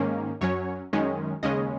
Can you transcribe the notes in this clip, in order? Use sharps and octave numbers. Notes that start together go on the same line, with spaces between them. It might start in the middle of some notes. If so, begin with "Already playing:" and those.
Already playing: G#2 D#3 A#3 C#4
F#2 F#3 C#4 C#5
F#2 D#3 G#3 C#4
D#2 C#3 G#3 C#4 D#5